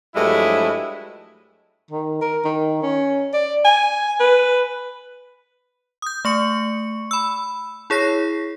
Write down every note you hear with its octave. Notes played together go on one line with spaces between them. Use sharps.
G2 F3 F#3 G#3 A3 E4
D#3
A#4
D#3
C#4
D5
G#5
B4
D#6 G6
A3 C#6 C#7
B5 E6
E4 G#4 C#5 A#6 C7